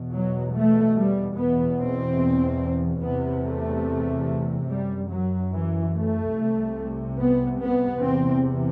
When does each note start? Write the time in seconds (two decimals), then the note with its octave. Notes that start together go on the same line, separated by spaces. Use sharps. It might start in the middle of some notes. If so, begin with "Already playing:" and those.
Already playing: E2 B2
0.14 F#3
0.55 A3
0.97 G3
1.38 E2 B2 B3
1.80 C4
3.03 E2 C3 B3
3.45 A3
4.69 F#2 G3
5.10 F#3
5.52 E3
5.94 A3
6.35 C2 C3
7.18 B3
7.59 B3
8.01 E2 C3 C4